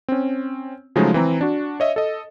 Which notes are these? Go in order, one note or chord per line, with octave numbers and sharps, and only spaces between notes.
C4 C#4
C#3 F3 F#3 G#3 A3 D#4
E3 C4 A#5
D4 F#4
C#5 D#5 E5
A4 D#5